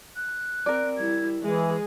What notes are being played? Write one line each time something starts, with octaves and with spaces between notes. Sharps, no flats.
F#6
C4 A#4 D5
G3 E4 G#6
E3 G#3 G#4 E5